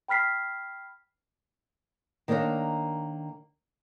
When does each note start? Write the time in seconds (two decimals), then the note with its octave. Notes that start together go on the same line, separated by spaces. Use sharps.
0.08 G5 B5 F6 B6 C7
2.28 D#3 A#3 D4 A#4 C#5